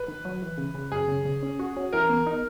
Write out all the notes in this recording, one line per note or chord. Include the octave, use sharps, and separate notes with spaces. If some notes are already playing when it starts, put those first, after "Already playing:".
Already playing: B4
D#3
F#3
E3
C#3
C#3
F#2 G#4
C#3
C#3
C#4
F#4
C#4
E3 A#4
B3
D#4